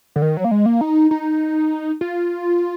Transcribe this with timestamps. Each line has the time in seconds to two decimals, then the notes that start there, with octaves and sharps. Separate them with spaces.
0.16 D3
0.22 D#3
0.37 F#3
0.44 A#3
0.51 G#3
0.66 A#3
0.81 D#4
1.11 D#4
2.01 F4